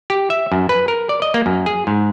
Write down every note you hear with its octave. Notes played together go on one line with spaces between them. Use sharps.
G4
E5
F#2
B4
A#4
D5
D#5
A#3
F#2
G#4
G#2